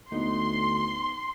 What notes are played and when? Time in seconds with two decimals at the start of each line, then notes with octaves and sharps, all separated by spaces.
0.12 D2 B3 D#4 C6